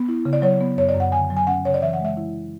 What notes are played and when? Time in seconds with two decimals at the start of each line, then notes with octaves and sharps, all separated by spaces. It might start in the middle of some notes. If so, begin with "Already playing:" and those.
Already playing: B3
0.08 E4
0.25 C#3
0.33 D5
0.42 F#3 C#5
0.61 B3
0.77 F#2 C#5
0.89 D5
0.95 F#2
1.00 F#5
1.12 D3 G#5
1.30 F#3
1.36 G#5
1.47 C#4 F#5
1.65 C#3 C#5
1.74 D5
1.82 E3 E5
1.93 F#5
2.00 G#3 E5
2.17 E4